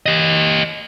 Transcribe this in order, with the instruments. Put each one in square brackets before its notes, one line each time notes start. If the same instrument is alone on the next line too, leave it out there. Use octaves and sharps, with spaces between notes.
[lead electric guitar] G4 D#5